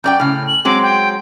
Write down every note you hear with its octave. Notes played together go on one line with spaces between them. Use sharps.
F#2 D5 G5 G6
A2 C#3 F6
F#7
F#3 G#3 C4 D6
G5